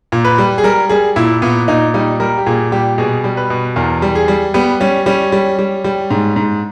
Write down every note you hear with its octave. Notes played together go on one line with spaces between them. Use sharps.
A#2
B4
G3
G#4
G3 A#4
G3 G#4
A#2 E4
A#2 B3
A#2 D#4
G3 D#4
G3 A#4
G4
A#2 G#4
G3 G4
B2 G#4
G3
B4
B2
E2 A#4
G3
G#4
G3
G3 B3
G3 C#4
G3 C#4
G3
G3
G3
G#2
G#2